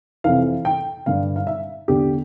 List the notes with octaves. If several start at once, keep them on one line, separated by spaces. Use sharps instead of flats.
F2 C3 E3 F5
G5
G2 D3 F5
F5
E5
E2 D3 G4